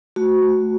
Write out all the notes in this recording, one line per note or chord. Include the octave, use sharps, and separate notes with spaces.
A3 F#4
A3